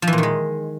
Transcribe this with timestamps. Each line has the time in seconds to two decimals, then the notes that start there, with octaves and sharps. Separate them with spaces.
0.02 F3
0.07 E3
0.13 A#2
0.18 D#3
0.23 G#3